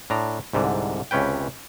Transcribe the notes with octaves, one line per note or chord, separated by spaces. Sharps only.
A2 D4 A#5
C2 G#2 D3
C#2 C3 C#4 B4 G5